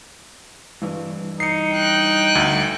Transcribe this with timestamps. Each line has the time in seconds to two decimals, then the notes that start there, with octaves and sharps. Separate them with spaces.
0.82 G2 E3
1.40 D#4 C7 C#7
1.73 G5 F#6
2.35 D2